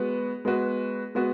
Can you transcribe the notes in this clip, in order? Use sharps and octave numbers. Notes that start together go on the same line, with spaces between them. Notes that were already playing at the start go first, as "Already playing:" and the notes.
Already playing: G#3 B3 F#4 B4
G#3 B3 F#4 B4
G#3 B3 F#4 B4